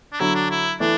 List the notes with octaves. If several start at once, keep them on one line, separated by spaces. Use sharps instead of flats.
D4
D3 F#3 E4
D4
E4
E3 A3 D4